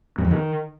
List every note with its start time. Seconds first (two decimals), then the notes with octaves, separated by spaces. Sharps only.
0.18 F#2
0.25 F2
0.31 D#3